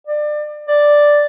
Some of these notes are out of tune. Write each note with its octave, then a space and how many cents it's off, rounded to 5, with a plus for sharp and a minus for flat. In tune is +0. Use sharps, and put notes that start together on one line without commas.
D5 +30
D5 +0